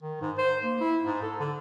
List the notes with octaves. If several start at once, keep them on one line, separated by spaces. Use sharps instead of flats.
D#3
G#2
C5
A#3
E4
G#2
A4
D3